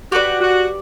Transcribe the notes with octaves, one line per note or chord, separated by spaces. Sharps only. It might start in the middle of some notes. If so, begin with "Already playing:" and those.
F#4 G4 B4 D5
F#4